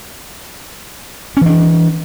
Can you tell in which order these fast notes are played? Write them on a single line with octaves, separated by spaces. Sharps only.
C#4 E3 D4